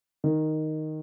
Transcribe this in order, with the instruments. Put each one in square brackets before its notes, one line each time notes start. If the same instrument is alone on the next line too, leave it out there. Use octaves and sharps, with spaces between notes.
[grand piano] D#3